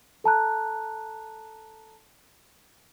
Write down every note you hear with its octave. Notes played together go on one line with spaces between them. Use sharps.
A4 A5 A#5 F#6